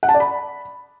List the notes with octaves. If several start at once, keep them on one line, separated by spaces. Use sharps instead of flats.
F#5
A5
D5
B5